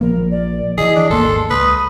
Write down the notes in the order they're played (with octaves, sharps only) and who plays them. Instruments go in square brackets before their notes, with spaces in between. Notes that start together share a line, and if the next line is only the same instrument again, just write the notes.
[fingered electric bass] A#1 F3 A#3 [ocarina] A#4
[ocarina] D5
[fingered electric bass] D#3 E3 [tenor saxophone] G#4 [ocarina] D#5
[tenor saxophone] D4
[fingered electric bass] G#1 D#2 A#3 [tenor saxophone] A4 [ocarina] C6
[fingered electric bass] C#2 [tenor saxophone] B4 [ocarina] D#6